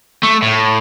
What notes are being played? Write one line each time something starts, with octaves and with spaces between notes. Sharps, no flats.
A3
A2